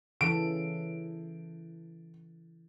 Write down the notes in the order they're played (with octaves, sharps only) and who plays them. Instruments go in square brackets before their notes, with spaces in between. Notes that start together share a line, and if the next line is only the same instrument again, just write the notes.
[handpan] C#3 E3 A4 [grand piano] D7